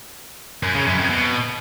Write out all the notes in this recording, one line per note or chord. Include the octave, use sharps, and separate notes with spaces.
F#2
C#3
F#2
F2
B2